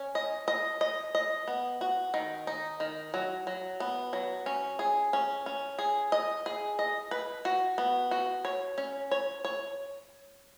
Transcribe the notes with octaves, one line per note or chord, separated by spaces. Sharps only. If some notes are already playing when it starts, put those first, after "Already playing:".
Already playing: C#4
D#5
D#5
D#5
D#5
B3
F#4
D#3
D#4
D#3
F#3
F#3
B3
F#3
C#4
G#4
C#4
C#4
G#4
D#5
G#4
D#5
B4
F#4
B3
F#4
C#5
C#4
C#5
C#5